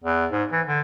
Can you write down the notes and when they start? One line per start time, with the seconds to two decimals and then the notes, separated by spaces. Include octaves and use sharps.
0.04 E2
0.31 G#2
0.52 E3
0.67 D3